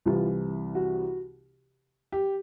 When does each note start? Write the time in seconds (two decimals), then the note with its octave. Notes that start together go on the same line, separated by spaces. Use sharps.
0.06 C2 C3 E3 F4
0.75 F#4
2.12 G4